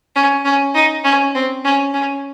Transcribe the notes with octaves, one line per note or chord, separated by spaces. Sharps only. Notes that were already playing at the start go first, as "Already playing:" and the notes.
C#4
C#4
D#4
C#4
C4
C#4
C#4